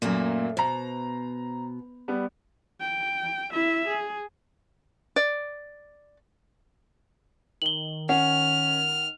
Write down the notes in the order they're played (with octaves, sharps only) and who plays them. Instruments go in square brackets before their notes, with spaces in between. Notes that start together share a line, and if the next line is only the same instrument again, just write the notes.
[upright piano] F#2 A#2 [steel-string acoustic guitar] F#3 A3 A#3
[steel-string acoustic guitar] B2 [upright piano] C5 A#5
[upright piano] G3 B3
[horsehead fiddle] G5
E4 E5
G#4
[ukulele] D5
[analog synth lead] D#3 [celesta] F#7 G7
[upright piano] C#4 [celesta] F#5 [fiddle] F6